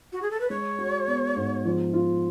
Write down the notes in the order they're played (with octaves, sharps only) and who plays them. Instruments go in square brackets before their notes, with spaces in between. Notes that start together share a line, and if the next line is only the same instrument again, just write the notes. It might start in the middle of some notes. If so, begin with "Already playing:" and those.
[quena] F#4
G#4
A4
B4
[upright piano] G#3 [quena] C#5
[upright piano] F#4
B3
G#2
F3
F4